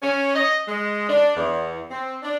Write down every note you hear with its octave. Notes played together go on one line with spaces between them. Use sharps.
C#4
D#5
G#3
D4
E2
C4
D4